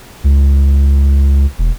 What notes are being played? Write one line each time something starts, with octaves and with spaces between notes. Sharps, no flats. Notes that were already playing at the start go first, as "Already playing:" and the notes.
C#2
E1